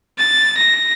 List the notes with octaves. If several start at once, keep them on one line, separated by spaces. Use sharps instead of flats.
A6
A#6